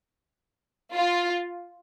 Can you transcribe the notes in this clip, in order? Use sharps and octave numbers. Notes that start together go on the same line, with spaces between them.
F4